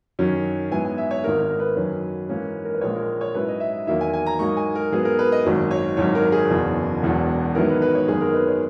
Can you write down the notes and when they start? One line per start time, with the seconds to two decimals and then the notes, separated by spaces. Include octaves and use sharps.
0.19 F#2 D#3 F#3 C#4
0.71 G#2 F#3 B3 E4 G#5
0.85 G#5
0.98 E5
1.11 C#5
1.24 G#1 G#2 D#3 A#3 D#4 A#4
1.41 A#4
1.59 B4
1.76 F#2 D#3 F#3 C#4
2.29 G#2 E3 A#3 C#4
2.65 A#4
2.74 B4
2.81 A#1 A#2 G#3 C#5
2.95 A#4
3.21 C#5
3.35 G#2 F#3 C#4 E4 B4
3.48 D#5
3.60 E5
3.87 E2 D#3 F#3 A#3 E5
4.01 G#5
4.13 G#5
4.26 A#5
4.39 G#2 F#3 A#3 D#4 C#6
4.57 G#5
4.75 A#4
4.92 G#2 F#3 B3 G#4
5.05 A#4
5.19 B4
5.32 D#5
5.45 G#1 F#2 D#3 F#3
5.71 C#5
5.97 G#1 F#2 D#3 F#3 C#5
6.15 A#4
6.32 G#4
6.50 F#1 E2 B2
7.02 E1 E2 B2 F#3
7.55 G#2 D#3 F#3 B3 E4 A#4
7.69 B4
7.82 B4
7.95 C#5
8.08 G#1 F#2 D#3 G#3 B3 G#4
8.21 A#4
8.34 B4
8.47 C#5